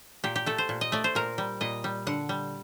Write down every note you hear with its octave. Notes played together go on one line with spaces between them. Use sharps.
A#2 G4
G4
A3 A4
C5
A#2
D#5
A3 D5
C5
A#2 A#4
G3
A#2 D#5
G3
D3 F#5
G3